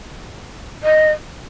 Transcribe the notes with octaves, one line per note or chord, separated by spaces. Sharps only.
D#5